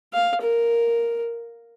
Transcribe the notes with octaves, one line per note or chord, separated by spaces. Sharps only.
F5
A#4